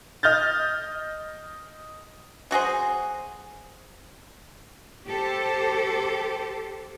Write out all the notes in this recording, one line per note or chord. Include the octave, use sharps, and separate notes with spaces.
D#5 F6 G6 A6
F#3 F#4 G#4 C5
G4 A4 C5